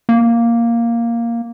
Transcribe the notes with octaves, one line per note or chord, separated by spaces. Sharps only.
A#3